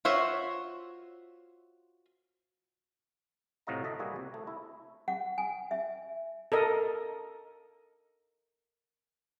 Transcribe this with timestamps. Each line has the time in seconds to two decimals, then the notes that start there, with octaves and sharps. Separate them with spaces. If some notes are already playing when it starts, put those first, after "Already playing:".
0.05 F4 F#4 C5 C#5 E5
3.67 A2 C3 F#4 D#5 F5 A#5
3.84 A4 D#5 E5
3.99 G3 A#3 E4 F#4 G#4
4.16 C3
4.34 A3
4.47 E4
5.08 F#5
5.38 G#5
5.71 E5
6.52 A4 A#4 D#5